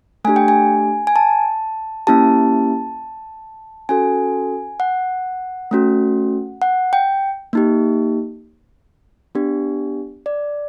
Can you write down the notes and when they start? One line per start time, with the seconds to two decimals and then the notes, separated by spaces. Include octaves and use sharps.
0.24 A3 D4 G4 G#5
0.36 G5
0.48 G#5
1.07 G#5
1.16 A5
2.07 A#3 C#4 E4 G4 A5
3.89 C#4 F#4 A4 G#5
4.80 F#5
5.71 A3 C#4 F#4
6.62 F#5
6.93 G5
7.53 A#3 D#4 G4
9.35 B3 D4 G4
10.26 D5